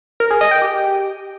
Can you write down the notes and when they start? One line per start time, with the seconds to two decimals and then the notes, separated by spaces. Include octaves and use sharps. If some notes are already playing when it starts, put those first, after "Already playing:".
0.20 A#4
0.31 G#4
0.41 D#5
0.51 G5
0.62 G4